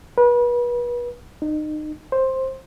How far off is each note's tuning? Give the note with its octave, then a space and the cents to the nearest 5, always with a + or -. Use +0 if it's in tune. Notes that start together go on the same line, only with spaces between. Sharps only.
B4 -35
D#4 -30
C5 +10